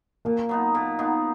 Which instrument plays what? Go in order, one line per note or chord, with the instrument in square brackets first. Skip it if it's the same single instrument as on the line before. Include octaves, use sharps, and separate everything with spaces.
[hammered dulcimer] A#2 [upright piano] A#3
[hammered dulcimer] F#3 B3 D#4
A#2
F#3 B3 D#4